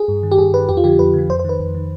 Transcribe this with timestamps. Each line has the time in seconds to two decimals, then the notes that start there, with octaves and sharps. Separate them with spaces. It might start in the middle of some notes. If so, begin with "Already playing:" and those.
Already playing: G#4
0.08 G2
0.23 D#3
0.32 G4
0.38 G2 G#4
0.54 D#3 B4
0.69 F2 G4
0.77 F4
0.84 D3 F3 G4
0.99 F2 B4
1.14 D3 F3
1.29 F2 C5
1.39 C5
1.45 D#3 B4
1.59 F2
1.75 D#3